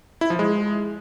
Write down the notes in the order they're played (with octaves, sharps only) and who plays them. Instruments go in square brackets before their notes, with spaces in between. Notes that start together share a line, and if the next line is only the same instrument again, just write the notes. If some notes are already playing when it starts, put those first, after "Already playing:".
[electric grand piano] E4
F3
G#3